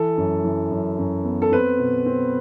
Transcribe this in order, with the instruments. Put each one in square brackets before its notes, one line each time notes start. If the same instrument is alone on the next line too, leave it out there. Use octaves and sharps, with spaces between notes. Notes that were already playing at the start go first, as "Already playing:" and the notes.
Already playing: [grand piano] E3 A4
F#2
E3
F#2
F#2
B3
A4
C4 B4
B2
C4